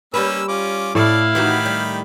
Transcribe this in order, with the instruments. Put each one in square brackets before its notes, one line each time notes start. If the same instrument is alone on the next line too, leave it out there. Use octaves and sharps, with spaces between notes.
[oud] G3 B4 [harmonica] A#3 C#4 E6
[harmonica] C#4 F4 D6
[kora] A2 [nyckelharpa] E4 F5 [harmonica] A4 D5
[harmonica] D#3 G4 B5 [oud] E3 D#4 F#4
[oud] G3